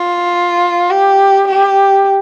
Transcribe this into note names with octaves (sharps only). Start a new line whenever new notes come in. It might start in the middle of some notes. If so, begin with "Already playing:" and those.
Already playing: F4
G4
G4